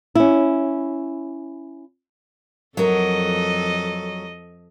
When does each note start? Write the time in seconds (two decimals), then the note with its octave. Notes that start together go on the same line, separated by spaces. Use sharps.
0.15 C#4 E4
2.77 F2 F#3 A4 A#4 D#5